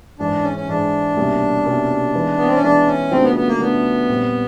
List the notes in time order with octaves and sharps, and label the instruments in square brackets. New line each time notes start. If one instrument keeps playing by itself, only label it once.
[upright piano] G#2 E3 G#3 [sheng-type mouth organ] D4
[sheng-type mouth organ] C#4
C#4
[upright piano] G#2 E3 G#3 [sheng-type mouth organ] D4
[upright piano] C2 B2 G3 A#3 C#4
C2 B2 G3 A#3 C#4
E3 G#3 B3 D#4
[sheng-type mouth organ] B3
C4
C#4
[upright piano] E3 G#3 B3 D#4 [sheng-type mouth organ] D4
[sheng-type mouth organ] C#4
[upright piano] C#3 F#3 A3 D4 F4 [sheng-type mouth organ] C4
[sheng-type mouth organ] B3
B3
A#3
[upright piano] C#3 F#3 A3 D4 F4 [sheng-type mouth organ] B3
[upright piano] A#2 G3 C4